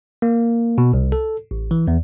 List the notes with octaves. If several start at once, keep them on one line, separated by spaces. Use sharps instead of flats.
A#3
B2
C2
A4
A1
E3
E2